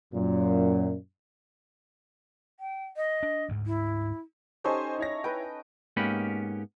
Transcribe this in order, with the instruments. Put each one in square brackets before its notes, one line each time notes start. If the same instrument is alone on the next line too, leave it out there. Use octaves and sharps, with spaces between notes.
[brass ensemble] F#2 A#2
[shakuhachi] G5
D#5
[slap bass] D4
D2 G#2
[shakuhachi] E4
[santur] C#4 D#4 A4 [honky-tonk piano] G4 C5 G#5
[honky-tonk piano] E4 C#5 A#6
[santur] B4 G5
[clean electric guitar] G#2 A#3 B3 C#4 G4 B5